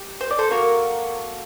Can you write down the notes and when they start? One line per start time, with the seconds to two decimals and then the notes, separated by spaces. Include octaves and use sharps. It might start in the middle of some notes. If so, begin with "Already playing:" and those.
Already playing: G4
0.21 C5
0.31 D5
0.38 A4 C5
0.50 A#3 F#4 A4 A#4